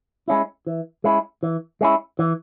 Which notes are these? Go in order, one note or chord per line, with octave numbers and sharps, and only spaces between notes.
G#3 C#4 E4
E3
G#3 C#4 E4
E3
G#3 C#4 E4
E3